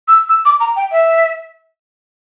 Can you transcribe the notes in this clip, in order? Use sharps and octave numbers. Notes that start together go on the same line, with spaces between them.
E6
E6
D6
A#5
G5
E5